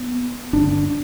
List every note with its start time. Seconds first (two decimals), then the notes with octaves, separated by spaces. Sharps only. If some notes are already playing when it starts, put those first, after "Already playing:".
Already playing: B3
0.53 G1 G2 D3 D4